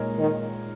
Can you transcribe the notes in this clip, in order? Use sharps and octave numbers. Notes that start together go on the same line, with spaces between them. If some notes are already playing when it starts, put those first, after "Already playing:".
Already playing: A#2 G#3 D#4 A#4 C#5
D#3